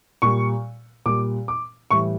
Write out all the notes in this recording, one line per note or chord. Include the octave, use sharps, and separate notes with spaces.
A#2 G3 C#6
A#2 G3 D6
D6
A2 E3 G3 C#6